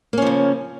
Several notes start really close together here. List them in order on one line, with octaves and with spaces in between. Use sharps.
A#3 C#4 F3 C#3